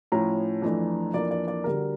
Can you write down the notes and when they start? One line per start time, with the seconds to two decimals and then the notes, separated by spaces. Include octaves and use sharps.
0.12 A2 F3 C#4 A#5
0.62 F2 E3 A3 D4
1.14 F2 E3 A#3 D4 D5
1.31 D5
1.48 D5
1.64 D2 D3 G3 A#4